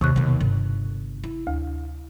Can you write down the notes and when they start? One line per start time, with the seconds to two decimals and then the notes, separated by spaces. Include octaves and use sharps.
0.01 D#2 C3 C#6 F#6
0.16 D#2 B2
0.41 G1
1.24 E4
1.47 D2